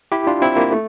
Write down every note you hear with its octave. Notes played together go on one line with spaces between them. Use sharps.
E4 G4
D4 F4
C4 E4
A#3
A3